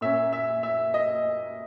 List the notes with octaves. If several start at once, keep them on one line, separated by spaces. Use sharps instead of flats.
A#2 A#3 C#4 E5
E5
E5
D#5